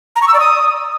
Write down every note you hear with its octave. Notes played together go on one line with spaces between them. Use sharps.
A#5
C#6
E6
D5
D#6